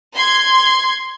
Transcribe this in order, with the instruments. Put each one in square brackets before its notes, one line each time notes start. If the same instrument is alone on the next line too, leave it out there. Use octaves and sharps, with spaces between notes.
[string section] C6 G#6